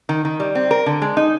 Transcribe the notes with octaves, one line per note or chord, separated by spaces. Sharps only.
D#3
D#3
G3
C4
A#4
D3
G#3
D#4